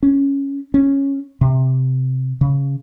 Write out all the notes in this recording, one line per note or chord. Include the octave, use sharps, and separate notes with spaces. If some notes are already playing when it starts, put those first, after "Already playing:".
C#4
C#4
C3
C#3